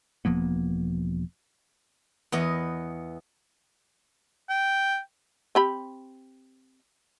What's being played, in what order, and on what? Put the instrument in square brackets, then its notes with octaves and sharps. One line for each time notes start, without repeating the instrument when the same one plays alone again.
[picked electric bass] E1 F3 A#3 B3
[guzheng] E2 B3 D#5
[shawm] G5
[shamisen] C4 G4 B5